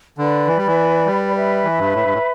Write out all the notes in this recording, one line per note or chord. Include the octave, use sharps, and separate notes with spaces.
D3 B4 D5 B5
E3
G3
E3
G3
B4 E5 B5
E3
G2
A2
G2
A2